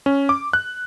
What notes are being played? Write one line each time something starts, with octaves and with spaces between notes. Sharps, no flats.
C#4
D6
F#6